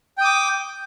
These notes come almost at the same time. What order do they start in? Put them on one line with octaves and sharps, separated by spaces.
G5 D#6 D6